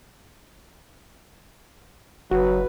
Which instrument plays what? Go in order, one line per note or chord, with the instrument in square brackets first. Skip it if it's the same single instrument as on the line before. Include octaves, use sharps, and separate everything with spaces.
[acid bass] F#1 [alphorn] F#3 [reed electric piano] F#4 [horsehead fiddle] B4